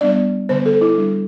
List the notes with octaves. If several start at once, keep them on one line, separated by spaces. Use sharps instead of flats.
G3 B3 D4 D5
D3 G3 B3 C5
A4
E4
G3 D4